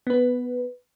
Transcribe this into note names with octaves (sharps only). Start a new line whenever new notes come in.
B3 B4